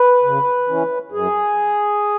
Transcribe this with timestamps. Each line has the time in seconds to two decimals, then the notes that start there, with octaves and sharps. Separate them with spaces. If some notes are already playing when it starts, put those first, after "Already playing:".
Already playing: B4
0.23 C#3
0.67 E3 C#4
1.12 F#2 G#4